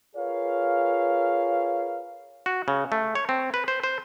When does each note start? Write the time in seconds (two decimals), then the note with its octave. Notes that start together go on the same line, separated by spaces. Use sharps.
0.16 F4 G#4 A#4 B4 C#5 F5
2.46 F#4
2.68 C#3
2.92 A3
3.15 C#5
3.29 C4
3.54 B4
3.68 C5
3.84 C5